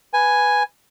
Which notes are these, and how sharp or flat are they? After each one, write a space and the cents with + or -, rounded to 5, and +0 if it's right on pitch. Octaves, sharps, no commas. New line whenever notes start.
B4 +0 G#5 +0